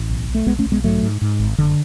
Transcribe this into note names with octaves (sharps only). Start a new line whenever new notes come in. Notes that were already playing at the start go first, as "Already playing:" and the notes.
Already playing: A1
B1
B1
A3
B1 G#3 B3
A3 C#4
B1
G#3 B3
G#2 F#3 A3
G#2
G#2
G#1
F#1 D3